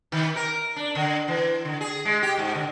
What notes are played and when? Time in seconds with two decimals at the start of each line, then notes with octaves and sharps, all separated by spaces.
0.12 D#3
0.36 A#4
0.76 D4
0.95 D3
1.28 E3
1.65 D3
1.81 G#4
2.05 G#3
2.22 G4
2.38 G#2
2.55 D3